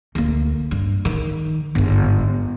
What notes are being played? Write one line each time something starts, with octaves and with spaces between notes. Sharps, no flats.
D2 A#3
G2
D#3
G1 G#2